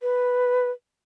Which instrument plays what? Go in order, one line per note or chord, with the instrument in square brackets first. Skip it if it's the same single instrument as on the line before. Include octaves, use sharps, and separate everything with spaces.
[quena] B4